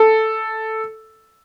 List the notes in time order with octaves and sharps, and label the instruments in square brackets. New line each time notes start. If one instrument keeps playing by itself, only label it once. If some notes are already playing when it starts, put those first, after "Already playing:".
Already playing: [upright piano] A4